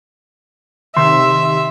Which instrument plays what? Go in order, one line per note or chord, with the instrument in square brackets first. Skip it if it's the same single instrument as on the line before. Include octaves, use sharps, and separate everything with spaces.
[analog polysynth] C3 D#3 [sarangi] E5 [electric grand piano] C6